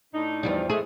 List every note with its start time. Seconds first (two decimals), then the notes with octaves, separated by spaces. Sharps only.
0.14 A2 D4 D#4
0.43 E2 F3 G3
0.70 G#3 A3 G#4